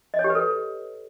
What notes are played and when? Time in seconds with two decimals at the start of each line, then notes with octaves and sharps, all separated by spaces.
0.14 D#5
0.19 C#5
0.24 G4
0.30 B4
0.35 A4